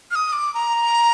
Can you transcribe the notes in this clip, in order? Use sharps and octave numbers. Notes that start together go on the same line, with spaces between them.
F6
D#6
D6
A#5